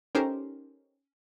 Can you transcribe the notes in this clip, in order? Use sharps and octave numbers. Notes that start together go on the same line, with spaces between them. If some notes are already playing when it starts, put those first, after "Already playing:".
C#4 D#4 G4 A4 A#4 C5